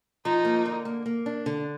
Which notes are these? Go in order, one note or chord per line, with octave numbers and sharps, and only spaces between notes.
F3 D#4
A#3
D3
A#3
A#3
D4
D3